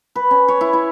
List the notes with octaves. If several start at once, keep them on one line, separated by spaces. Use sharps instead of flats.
B4
C#4
C#5
E4
E4